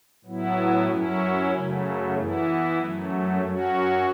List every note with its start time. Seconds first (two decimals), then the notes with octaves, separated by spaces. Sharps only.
0.24 A2 F#3 B3 E4
0.87 F#2 F#3 C#4 E4
1.51 F#2 C#3 F#3 A3
2.15 E3 B3 E4
2.78 F#2 F#3 A3
3.42 F#2 F#3 C#4 F#4